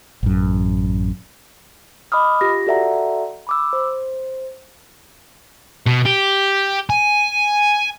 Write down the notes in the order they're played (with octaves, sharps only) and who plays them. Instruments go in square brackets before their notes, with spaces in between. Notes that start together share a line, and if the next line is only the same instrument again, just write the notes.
[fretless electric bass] A1 F#2
[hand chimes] D#5 B5 D6 D#6 F6
F4 G4 A#6
F#4 A4 D5 E5 F#5 A#5
B5 D6 E6
C5
[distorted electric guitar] B2
G4
G#5